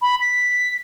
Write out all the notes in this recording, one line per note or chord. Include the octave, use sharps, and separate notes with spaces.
B5
B6